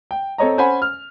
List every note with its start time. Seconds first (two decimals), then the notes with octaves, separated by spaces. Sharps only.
0.11 G5
0.38 C4 A4 C#5 D#5 A#5
0.58 C#4 C5 F#5 G#5 B5
0.82 F6